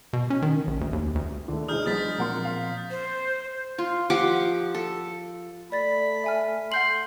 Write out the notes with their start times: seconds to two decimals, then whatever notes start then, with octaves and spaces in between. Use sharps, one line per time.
0.13 B2
0.30 C#4
0.42 D#3
0.67 A#1
0.81 D2
0.93 D#2
1.15 D2
1.48 D3 D#3 A3
1.68 D2 D4 D#4 G#4 D#5 D#6 F6 G6
1.86 F#3 G#3 B3 D#6 A6 B6
2.18 A#2 F3 C4 A#4 F#5 C6
2.45 F5
2.91 C5
3.78 F4
4.10 F3 G4 F#5 D6
4.75 A4
5.72 A3 D5 B5 A6
6.24 E5 G#5 F6
6.72 F#5 C6 G6 F#7